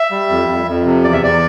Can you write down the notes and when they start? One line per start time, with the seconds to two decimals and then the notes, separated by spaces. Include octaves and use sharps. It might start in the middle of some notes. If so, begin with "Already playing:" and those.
Already playing: E5
0.11 G3
0.30 F2
0.49 F2
0.68 F2
0.86 C3
1.04 E2 D5
1.13 E5
1.23 E2 D5